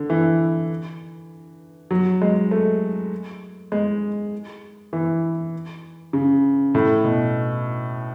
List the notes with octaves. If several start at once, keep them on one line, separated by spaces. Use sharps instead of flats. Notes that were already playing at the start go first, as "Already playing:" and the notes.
Already playing: D3
E3
F#3
G#3
A3
G#3
E3
C#3
A2
B2